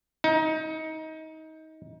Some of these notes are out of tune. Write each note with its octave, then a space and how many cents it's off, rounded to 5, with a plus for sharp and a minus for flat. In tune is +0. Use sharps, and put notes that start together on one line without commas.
D#4 +25